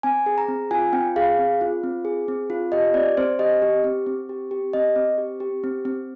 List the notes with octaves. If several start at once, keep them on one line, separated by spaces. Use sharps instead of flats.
C4 G#5
G#4
A#5
C4
F4 G#5
C4 G5
G#4 F5
C4
F4
C4
G#4
C4
F4
G4 D#5
C4 D5
C4 C5
G4 D#5
G4
C4
C4
G4
G4
C4 D#5
C4
G4
G4
C4
C4